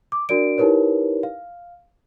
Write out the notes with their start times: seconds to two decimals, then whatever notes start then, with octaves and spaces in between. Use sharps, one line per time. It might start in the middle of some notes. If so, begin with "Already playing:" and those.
0.12 D6
0.29 D4 F#4 A#4 D5 D7
0.58 D#4 E4 G4 A#4 B4 C#5
1.23 F5